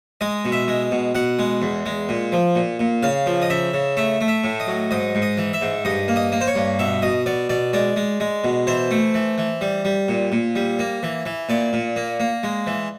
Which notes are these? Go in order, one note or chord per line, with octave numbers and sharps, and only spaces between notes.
G#3 D#5
B2
E5
G#3
B2
B2 F#5
G#3
E2
G#3
A#2
F3
A#2
A#2
C#3 F5
F3
D#5
C#3 E5
C#3
A3 E5
A3
E5
A2
D#5
F#3
G#2 D#5
G#2
D#5
E3
E5
G#2
G2 D#5
A#3
D#5
A#3
C5
C#5
G2
B2 E5
B2 D#5
B2 D5
B2 D5
G#3 D5
G#3
G#3
B2
E3 C5
A3
E3
E3
G3
G3
A#2
A#2
G3
A#3
E3
E3
A#2 D5
A#2
A#3
A#3
G#3
E3